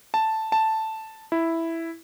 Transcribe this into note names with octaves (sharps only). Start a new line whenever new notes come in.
A5
A5
E4